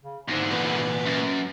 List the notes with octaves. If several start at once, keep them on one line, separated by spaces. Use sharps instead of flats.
C#3
E2 G#2 D3
A#2 E3 B3
F#2